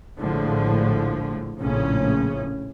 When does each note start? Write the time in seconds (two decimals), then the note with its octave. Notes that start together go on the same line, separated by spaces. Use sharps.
0.19 A#1 A2 D3 F3 G#3
1.60 A#1 A2 C#3 C#4